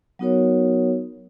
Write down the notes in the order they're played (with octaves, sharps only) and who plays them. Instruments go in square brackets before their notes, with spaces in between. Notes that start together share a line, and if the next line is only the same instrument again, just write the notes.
[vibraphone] F#3 B3 D#4 F#4 A#4 C#5